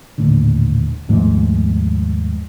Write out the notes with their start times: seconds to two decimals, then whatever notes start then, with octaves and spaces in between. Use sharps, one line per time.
0.18 D#1 A2 D3
1.09 D#2 G#2 F3 A3